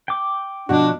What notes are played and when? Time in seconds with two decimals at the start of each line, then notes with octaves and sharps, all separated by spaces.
0.08 G5 D6
0.69 B2 F3 D4 F#4 F#5